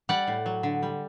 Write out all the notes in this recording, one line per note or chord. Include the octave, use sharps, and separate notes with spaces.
G3 D5 F#5
A2
F#3
D3
G3